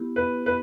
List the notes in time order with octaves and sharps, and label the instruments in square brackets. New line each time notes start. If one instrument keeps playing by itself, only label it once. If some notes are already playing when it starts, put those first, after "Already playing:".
Already playing: [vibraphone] B3 E4 G4
[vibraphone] B3 [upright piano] B4
[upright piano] B4